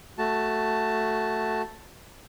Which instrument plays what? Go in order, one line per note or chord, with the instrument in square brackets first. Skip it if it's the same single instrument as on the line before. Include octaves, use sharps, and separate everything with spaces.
[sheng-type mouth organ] A3 F#4 A5